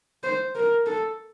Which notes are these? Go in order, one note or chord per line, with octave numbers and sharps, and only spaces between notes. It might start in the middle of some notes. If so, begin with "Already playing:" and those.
C5
A#4
A4